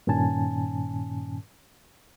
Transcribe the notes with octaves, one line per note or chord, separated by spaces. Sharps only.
G2 A#2 D#3 C#4 G#5 A5